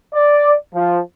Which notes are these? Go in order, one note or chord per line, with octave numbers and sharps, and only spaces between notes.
D5
F3